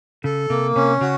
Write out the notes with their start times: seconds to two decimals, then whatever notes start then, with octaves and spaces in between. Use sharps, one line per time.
0.24 C#3 A4
0.50 C3 A#3
0.75 C3 C#4
1.01 C#3 F#4